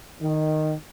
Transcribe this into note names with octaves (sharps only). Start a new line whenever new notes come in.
D#3